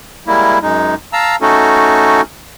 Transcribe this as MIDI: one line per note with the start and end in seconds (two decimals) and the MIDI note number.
0.27 0.59 55
0.27 0.59 56
0.27 0.59 58
0.27 0.59 64
0.62 0.95 42
0.62 0.95 56
0.62 0.95 63
1.13 1.36 77
1.13 1.36 81
1.13 1.36 82
1.13 1.36 88
1.41 2.21 57
1.41 2.21 61
1.41 2.21 63
1.41 2.21 66
1.41 2.21 69